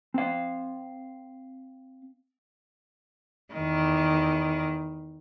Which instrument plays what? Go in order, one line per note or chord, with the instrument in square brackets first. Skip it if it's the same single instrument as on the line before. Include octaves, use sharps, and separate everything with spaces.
[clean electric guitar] C4 F5
[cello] E2 D#3